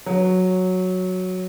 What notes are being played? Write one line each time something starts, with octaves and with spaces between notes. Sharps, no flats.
F#3